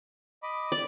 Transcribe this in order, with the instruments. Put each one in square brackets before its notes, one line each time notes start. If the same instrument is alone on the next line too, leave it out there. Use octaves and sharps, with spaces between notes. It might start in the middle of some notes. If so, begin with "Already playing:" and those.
[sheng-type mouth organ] D#5 B5 D6
[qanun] D5